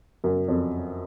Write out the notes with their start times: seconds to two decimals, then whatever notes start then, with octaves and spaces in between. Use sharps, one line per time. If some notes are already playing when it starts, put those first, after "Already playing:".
0.24 F#2
0.48 F2